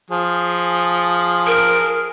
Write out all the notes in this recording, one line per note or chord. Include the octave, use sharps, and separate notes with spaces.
F3 G#4
A#4